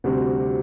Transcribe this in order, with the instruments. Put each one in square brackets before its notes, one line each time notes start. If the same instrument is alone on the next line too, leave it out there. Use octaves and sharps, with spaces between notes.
[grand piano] D2 C3 G3 C4 F#4